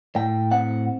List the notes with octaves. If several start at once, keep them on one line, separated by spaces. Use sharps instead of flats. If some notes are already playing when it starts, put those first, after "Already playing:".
A2 G5
C4 F#5